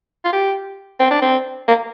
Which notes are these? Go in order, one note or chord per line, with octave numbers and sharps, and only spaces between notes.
F4
G4
C4
D4
C4
A#3